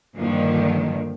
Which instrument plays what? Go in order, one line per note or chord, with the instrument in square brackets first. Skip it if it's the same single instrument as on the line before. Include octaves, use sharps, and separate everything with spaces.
[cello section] G2 A#2 D3 D#3 F3